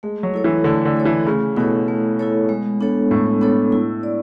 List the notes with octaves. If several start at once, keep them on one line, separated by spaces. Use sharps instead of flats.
G#3 A3
F#3
E4 A4 C#5
E3
D3 A3
D3
E4 A4 C#5
E3
C#3 A3
B2 E4 A4 C#5
A3
E4 A4 C#5
G#3
B3 D4 A4 C#5
A2 G#3
B3 D4 A4 C#5
E4
D5